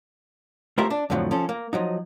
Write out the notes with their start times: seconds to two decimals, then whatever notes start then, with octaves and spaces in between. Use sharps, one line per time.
0.78 A3 F4 G4 A#4 C5 E5
0.90 D4
1.10 F2 A2 D3 F3 F#3
1.31 F3 C#4 A4
1.49 A#3
1.73 F3 F#3 D#4